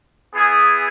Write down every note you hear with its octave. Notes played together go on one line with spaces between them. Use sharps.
B3 E4 G#4